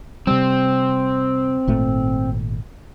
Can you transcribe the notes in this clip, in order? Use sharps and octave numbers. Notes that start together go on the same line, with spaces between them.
C3 G3 C4
G#1 A#2 A3